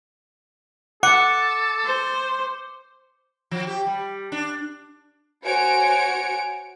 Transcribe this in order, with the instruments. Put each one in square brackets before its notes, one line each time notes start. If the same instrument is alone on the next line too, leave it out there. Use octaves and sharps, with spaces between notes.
[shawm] A4 [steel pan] F#5 [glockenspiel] D6 C#7
[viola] C5
[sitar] F3
G4
G3
D4
[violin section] F#4 C5 C#5 G#5 C#7 D7